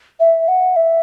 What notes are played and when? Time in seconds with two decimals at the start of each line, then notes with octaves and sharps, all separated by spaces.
0.20 E5
0.48 F#5
0.76 E5